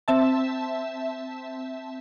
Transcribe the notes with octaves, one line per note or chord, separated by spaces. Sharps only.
C4 E5 A5